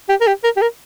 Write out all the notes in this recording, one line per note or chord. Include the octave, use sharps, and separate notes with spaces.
G4
A#4
G4
A#4
G4
A#4